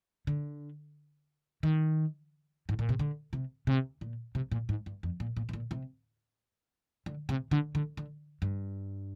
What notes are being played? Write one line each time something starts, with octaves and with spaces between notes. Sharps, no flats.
D3
D#3
G#2
A#2
C3
D3
C3
C3
A#2
C3
A#2
G#2
G2
F2
A#2
A#2
C3
A#2
C3
D3
C3
D3
D3
D3
G2